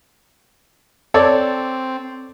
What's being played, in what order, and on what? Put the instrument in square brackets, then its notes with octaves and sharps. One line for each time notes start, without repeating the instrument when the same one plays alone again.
[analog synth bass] C4 [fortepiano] A4 C#5 D5